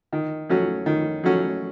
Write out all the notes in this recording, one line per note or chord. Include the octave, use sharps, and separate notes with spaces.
D#3
F#3 A3 C#4 F#4
D#3
F#3 A3 C#4 F#4